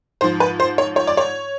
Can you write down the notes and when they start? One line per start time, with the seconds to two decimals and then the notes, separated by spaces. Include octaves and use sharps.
0.21 G#2 F3 C5
0.40 B4
0.60 C5
0.78 C#5
0.96 C#5
1.07 D5
1.17 C#5